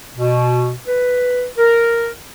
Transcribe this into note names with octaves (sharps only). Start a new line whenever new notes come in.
B2
B4
A#4